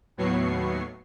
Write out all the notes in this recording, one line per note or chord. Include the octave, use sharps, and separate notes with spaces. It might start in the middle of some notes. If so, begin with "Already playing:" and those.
D#2 A2 F#3 B3 C#6 C7